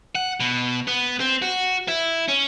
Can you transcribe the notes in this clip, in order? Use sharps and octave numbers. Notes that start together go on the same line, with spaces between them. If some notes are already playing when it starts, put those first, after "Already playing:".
F#5
B2
B3
C4
F#4
E4
C#4